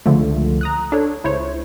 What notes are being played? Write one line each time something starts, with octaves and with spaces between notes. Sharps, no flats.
C#2 D3 F3 A3
A#5 D#6 F#6
D4 A4 C#5
C#2 E4 C5 C#5